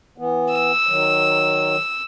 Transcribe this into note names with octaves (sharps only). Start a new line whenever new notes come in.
E3 B3
E6
D#3 F#3